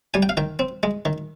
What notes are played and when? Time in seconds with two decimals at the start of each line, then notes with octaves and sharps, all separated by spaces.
0.14 G3 G#5
0.23 G5
0.29 F5
0.37 D#3 G5
0.59 C4
0.83 G#3
1.05 D#3